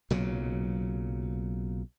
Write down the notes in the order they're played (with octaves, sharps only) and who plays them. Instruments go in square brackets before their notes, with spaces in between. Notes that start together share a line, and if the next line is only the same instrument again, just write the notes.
[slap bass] B1 A#2 C#3 F#3